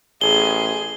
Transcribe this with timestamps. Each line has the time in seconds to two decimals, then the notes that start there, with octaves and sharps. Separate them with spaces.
0.21 A1 G#4 G7